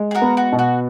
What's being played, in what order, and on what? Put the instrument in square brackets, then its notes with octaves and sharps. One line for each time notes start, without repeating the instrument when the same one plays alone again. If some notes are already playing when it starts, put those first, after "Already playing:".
Already playing: [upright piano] G#3
[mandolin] G#4
F#4 A#4
[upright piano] B3
[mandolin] F#4
[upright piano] B2
[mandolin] F#4